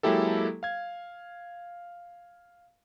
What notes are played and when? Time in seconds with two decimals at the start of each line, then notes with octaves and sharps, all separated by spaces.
0.03 F#3 G#3 A#3 E4 G4 A4
0.63 F5 G#6